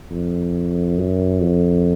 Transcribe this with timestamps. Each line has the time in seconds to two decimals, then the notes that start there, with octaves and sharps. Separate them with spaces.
0.11 F2
0.98 F#2
1.42 F2